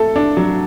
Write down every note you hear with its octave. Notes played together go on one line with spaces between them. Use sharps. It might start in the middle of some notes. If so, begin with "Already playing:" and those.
Already playing: A3 A4
D4
F#3